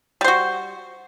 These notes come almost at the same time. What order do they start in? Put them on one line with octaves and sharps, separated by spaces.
G3 C5 F#4